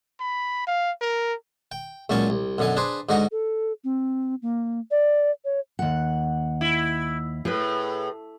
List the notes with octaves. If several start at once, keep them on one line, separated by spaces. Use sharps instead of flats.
B5
F5
A#4
G5
C#2 A#2 F#3 C#4 A5 C#6
C2
F#2 B2 D3 A4 G#5
D4 G#4 B4 C5
G#2 D3 F#4 D#5 F#5
A4
C4
A#3
D5
C#5
D#2 F#5
E4
A2 G#4 B4